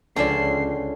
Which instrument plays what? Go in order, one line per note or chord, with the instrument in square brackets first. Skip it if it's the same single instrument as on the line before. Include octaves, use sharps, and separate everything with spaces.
[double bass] C#2 [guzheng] D3 C#4 E5 [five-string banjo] F3 D5 [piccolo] C7